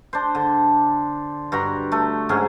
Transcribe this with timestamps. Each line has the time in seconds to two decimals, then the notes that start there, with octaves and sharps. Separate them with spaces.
0.13 D4 C5
0.35 D3
1.52 G2 F#4 A#5
1.92 A3
2.29 G#2 F#3 C#4 G#4